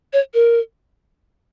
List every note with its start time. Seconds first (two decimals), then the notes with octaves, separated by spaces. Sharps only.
0.13 C#5
0.34 A#4